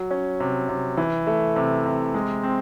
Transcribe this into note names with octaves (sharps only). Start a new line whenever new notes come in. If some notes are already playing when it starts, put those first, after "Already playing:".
Already playing: F#3
C#4
C3
C3
E3
A3
C3
C3
G#3
C4